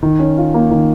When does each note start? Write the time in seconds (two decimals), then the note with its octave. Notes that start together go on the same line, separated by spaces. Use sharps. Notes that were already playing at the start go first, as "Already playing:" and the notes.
0.03 D#3
0.19 C#4
0.37 F4
0.54 A#3
0.71 D#3